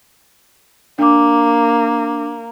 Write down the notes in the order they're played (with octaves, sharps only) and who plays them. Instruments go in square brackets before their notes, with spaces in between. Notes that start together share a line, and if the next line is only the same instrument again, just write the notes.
[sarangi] A#3 [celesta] D4 D6